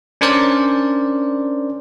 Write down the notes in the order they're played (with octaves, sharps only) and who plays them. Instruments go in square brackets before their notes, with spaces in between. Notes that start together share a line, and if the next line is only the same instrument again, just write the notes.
[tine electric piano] C#4 D4 A#4 C5 D5